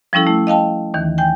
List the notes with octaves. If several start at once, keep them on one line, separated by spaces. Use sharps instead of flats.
F3 G3 C#4 E4 A4
A3 E4
D#5 F5 G5 A5
D#2 D#3 E3
G5 G#5 G6